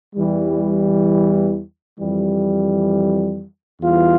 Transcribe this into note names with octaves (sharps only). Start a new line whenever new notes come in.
E2 E3 G3
F2 E3 G3
E2 E3 G3 F4